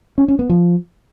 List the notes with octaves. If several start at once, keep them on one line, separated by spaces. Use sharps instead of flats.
C#4
C#4
B3
F3